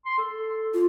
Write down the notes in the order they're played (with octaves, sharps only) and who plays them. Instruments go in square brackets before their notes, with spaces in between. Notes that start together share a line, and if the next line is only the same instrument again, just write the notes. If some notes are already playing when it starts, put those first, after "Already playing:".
[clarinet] C6
A4
[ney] F4